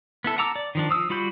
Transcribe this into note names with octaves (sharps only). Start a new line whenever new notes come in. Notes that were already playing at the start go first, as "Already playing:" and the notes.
B3 E4 A4
F#5 A5 A#5 D6 E6
D5
D#3 F3 D4
F3 D#6 E6
G3 F4 F#4 B5 G6